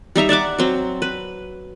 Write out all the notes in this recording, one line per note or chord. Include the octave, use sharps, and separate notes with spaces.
G3 D#4 E5 A#5
D5 E5 F#5 D6
F#3 C4
B4